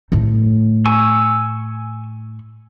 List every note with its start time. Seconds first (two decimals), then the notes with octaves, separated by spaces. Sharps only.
0.12 A2 A3
0.86 G#5 C#6 E6